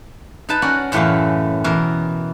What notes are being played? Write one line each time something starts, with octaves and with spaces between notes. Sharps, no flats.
D#4 B4 A5
C#4 F#4 A#4 D5
F#2 A2 E3 A3 G4 F5
B2 E3 A#4